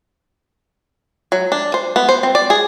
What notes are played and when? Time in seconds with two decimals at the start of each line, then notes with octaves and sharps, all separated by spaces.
1.32 F#3
1.52 D4
1.74 C5
1.96 B3
2.09 C5
2.23 C4
2.35 D5
2.50 G#4